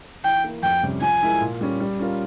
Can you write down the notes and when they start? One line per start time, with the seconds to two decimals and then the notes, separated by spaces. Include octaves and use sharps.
0.24 E3 G5
0.44 A#3 E4
0.63 F2 G5
0.83 C3 G3 C#4
1.01 F3 G#5
1.22 G#3 E4 A#4
1.41 A#2
1.61 G3 C#4
1.80 G3
1.99 C#4 F4 A#4